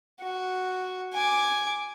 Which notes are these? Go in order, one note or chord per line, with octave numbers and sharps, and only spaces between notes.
F#4
G#5 D6